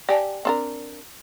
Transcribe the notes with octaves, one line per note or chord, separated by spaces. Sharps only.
G4 D5 G#5 A5
C4 D4 A#4